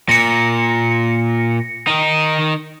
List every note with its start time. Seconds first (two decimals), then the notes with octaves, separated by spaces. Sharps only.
0.09 A#2 A#6 C#7
1.87 D#3 D#4